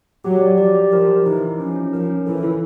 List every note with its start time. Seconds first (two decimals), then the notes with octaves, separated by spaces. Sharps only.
0.24 F#3 G4
0.41 D5
0.58 F3 D5
0.75 G4
0.93 F3 A#4
1.08 A#4
1.26 E3 D#4
1.43 D#4
1.59 F3 C#4
1.76 C#4
1.93 F3 A#4
2.10 C#4
2.26 E3 A4
2.43 E4